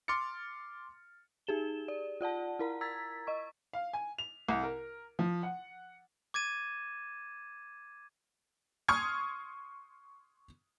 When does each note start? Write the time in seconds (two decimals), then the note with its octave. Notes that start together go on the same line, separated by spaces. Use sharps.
0.08 C6 D6 F6 A6 C#7
1.47 D#4 G4 G#4 E7 G7
1.88 D5
2.21 F4 D5 F#5 A5
2.59 E4 A#4 A#5
2.81 A#5 E6 G#6 A6 B6
3.27 D#5 C#6
3.73 F5
3.93 G#5
4.18 F7
4.49 C2
4.63 A#4
5.19 F3
5.43 F#5
6.34 D6 G#6 A6 D#7 E7
8.88 C6 C#6 D#6 F6 G#6